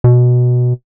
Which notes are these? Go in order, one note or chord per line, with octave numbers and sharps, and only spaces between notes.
B2